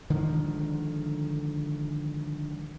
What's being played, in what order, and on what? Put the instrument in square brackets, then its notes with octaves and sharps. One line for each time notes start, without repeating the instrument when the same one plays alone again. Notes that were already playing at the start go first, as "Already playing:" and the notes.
[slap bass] D3 D#3 F3 G#3